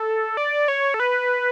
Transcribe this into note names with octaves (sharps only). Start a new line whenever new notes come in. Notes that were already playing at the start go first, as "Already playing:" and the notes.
Already playing: A4
D5
C#5
A4
B4